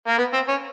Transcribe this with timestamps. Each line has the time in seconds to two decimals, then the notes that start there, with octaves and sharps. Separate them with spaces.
0.08 A#3
0.18 B3
0.33 C4
0.48 C#4